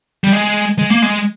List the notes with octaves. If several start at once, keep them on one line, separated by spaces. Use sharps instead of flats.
G3
G#3
G#3
A#3
G#3